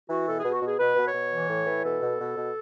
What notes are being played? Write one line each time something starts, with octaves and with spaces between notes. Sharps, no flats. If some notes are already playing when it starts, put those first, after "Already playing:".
E3 F#4
B2 A4
B2 G#4
F#4
B2 G#4
B2 B4
B2
C#5
B2
E3
A2
E3
B2 A4
B2
B2
B2